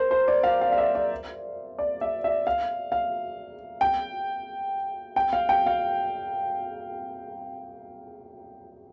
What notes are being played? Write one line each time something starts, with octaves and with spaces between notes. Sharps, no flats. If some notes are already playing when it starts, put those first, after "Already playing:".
Already playing: A#4 C5
C5
D5
F5
F5
F5
E5
D5
D5
E5
E5
F5
F5
G5
G5
F5
G5
F5